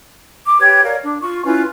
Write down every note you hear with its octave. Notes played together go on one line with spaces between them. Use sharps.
D6
G4 B4 C#5 G#6
A#4 C#5 D5 F5
D4
F4 C#6
C#4 E4 F4 B4